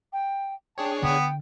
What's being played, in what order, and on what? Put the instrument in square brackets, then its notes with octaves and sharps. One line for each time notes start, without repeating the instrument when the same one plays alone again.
[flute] G5
[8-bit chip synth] D4 G#4 C#5 [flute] G5 [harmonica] A5
[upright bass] D3 [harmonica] B3 [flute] G5